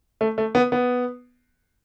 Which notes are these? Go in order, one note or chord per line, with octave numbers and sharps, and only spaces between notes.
A3
A3
B3
B3